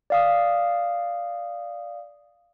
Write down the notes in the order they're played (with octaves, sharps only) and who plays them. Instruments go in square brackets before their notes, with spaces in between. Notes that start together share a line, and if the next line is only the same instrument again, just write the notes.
[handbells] D5 F5 D#6